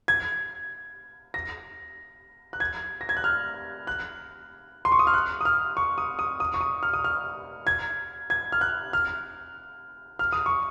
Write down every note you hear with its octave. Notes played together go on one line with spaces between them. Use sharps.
G#6
A#6
F#6
G#6
A#6
G#6
F#6
F6
F#6
C6
C#6
D#6
F6
F#6
D#6
F6
C#6
D#6
D#6
D#6
C#6
D#6
F6
D#6
F6
G#6
G#6
F6
F#6
F6
F6
D#6
C#6